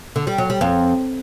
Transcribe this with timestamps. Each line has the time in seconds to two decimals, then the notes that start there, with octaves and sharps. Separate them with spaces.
0.16 D3
0.27 G3
0.38 F#3
0.50 G3
0.61 F2